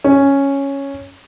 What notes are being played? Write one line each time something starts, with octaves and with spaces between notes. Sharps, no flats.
C#4